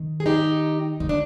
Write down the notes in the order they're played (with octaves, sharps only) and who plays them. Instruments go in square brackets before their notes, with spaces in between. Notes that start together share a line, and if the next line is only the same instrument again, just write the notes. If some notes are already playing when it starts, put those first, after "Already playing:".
Already playing: [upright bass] D#3
[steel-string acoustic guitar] G#4
D#4 G4
[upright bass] D3 [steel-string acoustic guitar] D#4
[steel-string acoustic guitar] D4